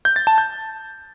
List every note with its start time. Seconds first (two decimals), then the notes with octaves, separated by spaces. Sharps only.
0.05 G6
0.16 A6
0.27 A5
0.38 G6